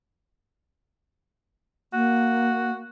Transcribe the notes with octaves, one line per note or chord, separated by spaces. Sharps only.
A#3 F#4